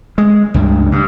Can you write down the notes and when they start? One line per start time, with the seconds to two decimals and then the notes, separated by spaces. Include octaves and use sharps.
0.18 G#3
0.54 C#2 G2
0.92 G2